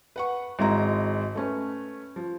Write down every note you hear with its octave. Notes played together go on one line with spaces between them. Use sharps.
B4 F#5 C#6
G#1 G#3 E4 F#4 A#5
A3 C#4 B4
F3